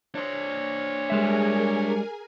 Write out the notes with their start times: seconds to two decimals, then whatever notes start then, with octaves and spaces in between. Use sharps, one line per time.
0.15 D4 C5 C#5
1.10 G3 G#3 G#4 A#4 E5 G#5